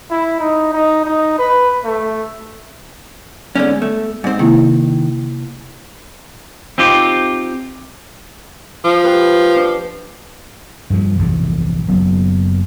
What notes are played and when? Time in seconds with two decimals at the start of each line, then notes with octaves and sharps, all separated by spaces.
0.11 E4
0.40 D#4
0.73 D#4
1.06 D#4
1.38 B4
1.85 A3
3.56 G#2 D3 B3 C#4
3.82 A3
4.24 G#2 C4
4.39 C3 D#3 A#3 E4
6.78 C4 D#4 F4 G4
8.84 F3
9.04 G4 B4
9.56 D4
10.90 G2 A#2 C#3 F3
11.19 A#1 E2 G#2 C3
11.88 F#1 F#3 B3